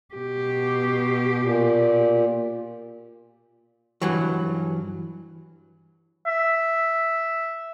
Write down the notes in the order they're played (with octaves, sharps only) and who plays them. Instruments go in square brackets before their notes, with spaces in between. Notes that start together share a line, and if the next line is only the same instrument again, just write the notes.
[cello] B2 G4
[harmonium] A#2
[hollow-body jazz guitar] G2 E3 F#3
[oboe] E5